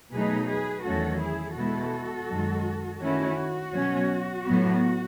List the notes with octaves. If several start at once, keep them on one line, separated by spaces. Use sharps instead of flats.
B2 F#3 A3 D#4 G#4 B4
G#4 B4
E2 D#3 F#3 A3 C#4 F#4 A4
E4 G#4
B2 G#3 B3 E4 F#4 A4
F#2 D#3 G#3
D#3 A3 C#4 E4 F#4
B2 F#3 C#4
A2 F#3 B3